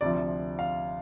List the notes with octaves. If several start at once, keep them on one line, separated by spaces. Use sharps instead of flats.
D2 C3 F3 D5
F5